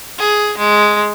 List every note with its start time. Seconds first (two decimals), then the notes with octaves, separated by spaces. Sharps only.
0.18 G#4
0.58 G#3